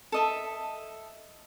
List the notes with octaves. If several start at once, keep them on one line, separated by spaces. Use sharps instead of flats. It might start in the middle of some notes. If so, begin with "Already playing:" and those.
A4 D#5 E5